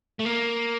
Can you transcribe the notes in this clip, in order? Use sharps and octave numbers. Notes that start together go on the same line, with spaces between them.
A3
A#3